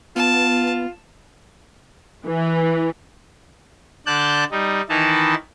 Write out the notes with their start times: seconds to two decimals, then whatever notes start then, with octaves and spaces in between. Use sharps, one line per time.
0.16 B3 F4 A5
2.25 E3
4.06 D3 D5 A5 F#6 G6
4.51 G3 D#4
4.89 D#3 E3 D#4 E4 A5